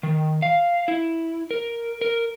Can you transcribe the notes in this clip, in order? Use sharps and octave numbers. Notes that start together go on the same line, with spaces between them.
D#3
F5
E4
A#4
A#4